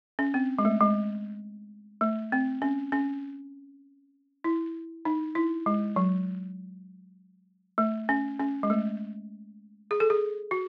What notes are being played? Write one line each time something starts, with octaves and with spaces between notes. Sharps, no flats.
C#4
C4
G#3
A3
G#3
A3
C4
C#4
C#4
E4
D#4
E4
G#3
F#3
A3
C#4
C#4
G#3
A3
G#4
A4
G#4
F#4